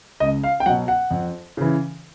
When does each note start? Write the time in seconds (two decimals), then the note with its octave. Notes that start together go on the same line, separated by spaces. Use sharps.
0.20 C#2 D#5
0.44 F5
0.60 G5
0.66 F#3 F#5
0.69 B2
0.88 F#5
1.11 F2
1.57 C#3 E3